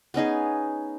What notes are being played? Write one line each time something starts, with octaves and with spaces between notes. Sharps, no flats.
B3 C#4 D#4 G#4